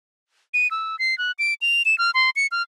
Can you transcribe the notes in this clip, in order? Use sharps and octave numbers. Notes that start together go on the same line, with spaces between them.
D#7
E6
C7
F#6
D7
F7
E7
F6
C6
C#7
F6